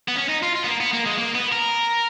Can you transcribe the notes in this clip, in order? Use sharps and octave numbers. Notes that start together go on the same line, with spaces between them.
B3
C#4
D#4
F4
F4
B3
A#3
B3
A#3
G#3
A#3
B3
A#4